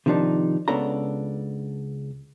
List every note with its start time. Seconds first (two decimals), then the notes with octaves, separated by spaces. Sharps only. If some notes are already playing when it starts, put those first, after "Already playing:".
0.06 C3 D#3 F3 B3 D4 D#4
0.68 C#2 C#3 B3 D4 A4 A#5